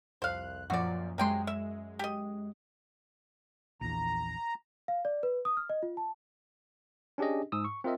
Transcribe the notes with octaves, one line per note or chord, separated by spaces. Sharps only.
C2 F2 C5 F5 F#6
F#2 A#2 F3 F#4 D5
F#2 C3 G#3 G5 C6
E5
G4 D#5
A#1 E2 A#5
F5
D5
B4
D#6
F6
D#5
F4
A5
C#4 D4 G4 G#4 D#5
G#2 D#6 E6
C#6
C4 F4 A#4 D#5 E5